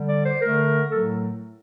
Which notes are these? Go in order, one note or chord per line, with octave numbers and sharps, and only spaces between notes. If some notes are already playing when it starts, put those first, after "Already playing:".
Already playing: D3 G3
D5
C5
D3 A3 A#4
A2 F#3 A3 A4